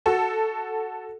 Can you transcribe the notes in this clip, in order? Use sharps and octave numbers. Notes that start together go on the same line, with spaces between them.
F#4 A4